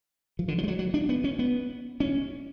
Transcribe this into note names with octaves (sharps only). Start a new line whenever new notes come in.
F3
D3
F3
G#3
F#3
F#3
D4
B3
C#4
B3
C#4